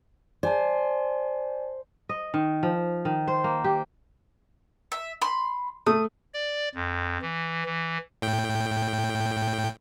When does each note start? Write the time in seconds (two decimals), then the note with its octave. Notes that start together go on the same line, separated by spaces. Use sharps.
0.43 C5 D5 G#5 A5
2.09 D#5
2.34 D#3
2.63 F3
3.05 D#3
3.28 C5
3.44 A#3
3.64 G4
4.92 E5
5.22 B5 C6
5.87 A3 D#6
6.34 D5
6.75 F2
7.22 E3
7.66 E3
8.22 A2 G5